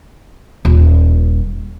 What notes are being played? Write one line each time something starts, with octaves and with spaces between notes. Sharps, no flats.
D#1